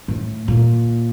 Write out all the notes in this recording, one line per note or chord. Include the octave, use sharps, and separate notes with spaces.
A2
A#2